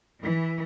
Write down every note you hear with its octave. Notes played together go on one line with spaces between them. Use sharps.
E3